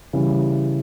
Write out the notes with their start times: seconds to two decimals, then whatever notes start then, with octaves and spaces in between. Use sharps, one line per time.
0.13 C#3 E3 G3